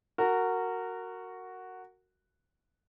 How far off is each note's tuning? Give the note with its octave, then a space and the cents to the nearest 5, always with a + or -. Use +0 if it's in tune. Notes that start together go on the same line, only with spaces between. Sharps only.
F#4 +0 A#4 -20